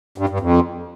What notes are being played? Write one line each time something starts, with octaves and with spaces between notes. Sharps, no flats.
G2
G2
F2